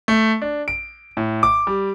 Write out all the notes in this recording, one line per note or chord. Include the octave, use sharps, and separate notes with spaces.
A3
D4
D7
A2
D6
G3